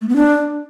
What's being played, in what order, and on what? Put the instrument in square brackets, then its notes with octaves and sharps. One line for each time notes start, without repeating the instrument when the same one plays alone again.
[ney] A3
B3
D4